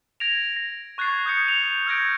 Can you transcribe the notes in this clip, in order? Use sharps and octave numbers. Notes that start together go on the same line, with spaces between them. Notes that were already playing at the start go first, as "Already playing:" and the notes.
G#6 A#6 D7 F7
A#6
C#6 F#6 G#6 A6 C7
D#6 G6 G#6 C#7
D#7 F7
E6 F6 G6 G#6 A#6 D7